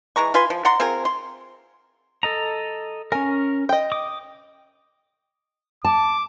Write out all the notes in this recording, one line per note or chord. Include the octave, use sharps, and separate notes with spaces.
E3 G#3 A#5 C#6
F4 B4 G#5 C6
F3
D5 F#5 A#5 C6
C4 F4 G#4 A#4
C6
A4 D#5 A#5
C#4 A#4 G#5
D#5 G5
D6 D#6
A5 D6